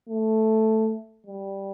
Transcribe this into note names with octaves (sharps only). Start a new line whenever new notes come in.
A3
G3